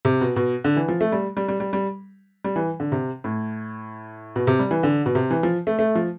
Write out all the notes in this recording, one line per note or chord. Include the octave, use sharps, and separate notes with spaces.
C3
B2
B2
D3
E3
F3
A3
G3
G3
G3
G3
G3
G3
E3
D3
C3
A2
B2
C3
G3
E3
D3
B2
C3
E3
F3
A3
A3
F3